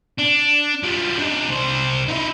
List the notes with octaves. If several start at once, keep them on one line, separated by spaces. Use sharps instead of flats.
D4
F3 G3
D4 D#4
C2 C5
D#4 E4